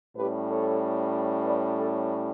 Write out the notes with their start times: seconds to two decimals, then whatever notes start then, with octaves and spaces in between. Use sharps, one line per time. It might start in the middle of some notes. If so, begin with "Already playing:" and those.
0.16 A2 G3 C#4 G4 B4
0.49 A4 C#5
1.44 B4 D5
1.76 A4 C#5